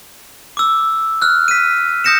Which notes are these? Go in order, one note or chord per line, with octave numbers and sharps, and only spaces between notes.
D6 E6
F6 F#6
B6 D#7
D#6 G6 A#6 C#7 E7